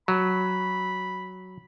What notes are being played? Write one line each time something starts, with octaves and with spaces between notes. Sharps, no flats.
F#3 B5